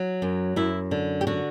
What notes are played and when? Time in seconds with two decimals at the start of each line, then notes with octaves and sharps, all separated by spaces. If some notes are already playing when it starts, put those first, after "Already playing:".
Already playing: F#3
0.22 F#2
0.56 F#2 E4
0.91 D3
1.21 G4
1.27 D3 F#4